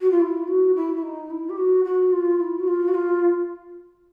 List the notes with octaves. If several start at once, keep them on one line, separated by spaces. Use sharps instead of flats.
F#4
F4
E4
F#4
E4
E4
D#4
E4
G4
F#4
F#4
F4
E4
F#4
F4
F#4
F4